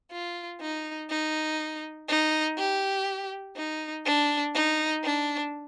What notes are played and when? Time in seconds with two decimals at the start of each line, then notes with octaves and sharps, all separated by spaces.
0.12 F4
0.61 D#4
1.10 D#4
2.08 D#4
2.58 G4
3.56 D#4
4.05 D4
4.54 D#4
5.04 D4